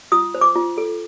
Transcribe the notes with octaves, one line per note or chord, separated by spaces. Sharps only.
F4 D#6
C5
D6
F4
A4